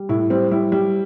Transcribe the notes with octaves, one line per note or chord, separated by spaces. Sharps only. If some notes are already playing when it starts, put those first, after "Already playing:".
Already playing: G3
A2 E4
G3 C4
G3 E4
G3